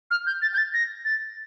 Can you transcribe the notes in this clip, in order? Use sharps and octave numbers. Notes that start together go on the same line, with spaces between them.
F6
G6
A6
G6
A6
A#6
A6